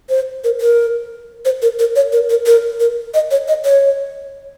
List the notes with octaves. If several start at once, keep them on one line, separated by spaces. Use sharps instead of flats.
C5
A#4
A#4
C5
A#4
A#4
C#5
A#4
A#4
A#4
A#4
D#5
C#5
D#5
C#5